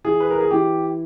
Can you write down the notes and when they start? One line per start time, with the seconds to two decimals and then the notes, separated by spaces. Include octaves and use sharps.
0.04 E3 G#4
0.20 B4
0.30 A#4
0.41 G#4
0.51 E3 G4